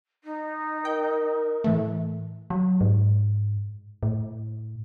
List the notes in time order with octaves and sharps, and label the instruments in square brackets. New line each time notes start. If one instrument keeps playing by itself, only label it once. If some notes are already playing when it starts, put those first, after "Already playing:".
[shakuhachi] D#4
[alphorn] A#4 [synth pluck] G5
[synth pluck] A2 E3 A3
[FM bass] F#3
G#2
A2